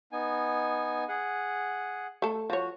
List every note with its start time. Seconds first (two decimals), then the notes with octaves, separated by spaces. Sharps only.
0.12 B3 D#4 G#5
1.09 G#4 F#5
2.22 A3 A4
2.50 F3 F#4 C#5